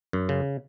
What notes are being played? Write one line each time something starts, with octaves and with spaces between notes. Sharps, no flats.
F#2
C#3